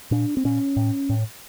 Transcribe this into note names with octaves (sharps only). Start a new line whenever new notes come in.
A#2 D4
C4
A#2 C#4
A2
A2